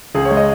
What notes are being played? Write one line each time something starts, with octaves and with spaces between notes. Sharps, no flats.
C#2 G#4
C#5
G#3
D#5